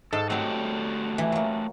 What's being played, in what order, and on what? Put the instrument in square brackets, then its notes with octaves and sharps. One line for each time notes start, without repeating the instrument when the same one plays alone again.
[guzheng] G#2 [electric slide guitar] A4
[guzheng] F#3 C4 [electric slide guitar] A3 F#4 G4
[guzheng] E3
F#3 A#3